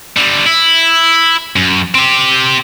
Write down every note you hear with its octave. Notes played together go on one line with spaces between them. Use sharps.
D3 G3
E4
F#2
C4 G4